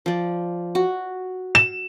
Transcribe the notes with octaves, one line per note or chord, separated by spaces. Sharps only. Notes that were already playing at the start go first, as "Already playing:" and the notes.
F3 D5
F#4
E7